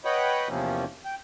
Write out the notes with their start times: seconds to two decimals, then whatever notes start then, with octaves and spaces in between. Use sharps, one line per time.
0.05 B4 C#5 D#5 F#5 G5 B5
0.49 E2 C3 F3 A#3 C4 C#4
1.05 G5